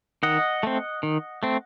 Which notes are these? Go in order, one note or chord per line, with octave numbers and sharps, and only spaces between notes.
D#3 D#5 F#5
A3 C4
D#3
A3 C4